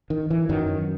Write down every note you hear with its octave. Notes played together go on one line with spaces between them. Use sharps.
D#3
E3
F#2 D#3 F#3